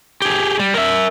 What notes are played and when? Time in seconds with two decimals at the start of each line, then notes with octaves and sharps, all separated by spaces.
0.22 G4 G#4
0.59 G3
0.74 A#4 E5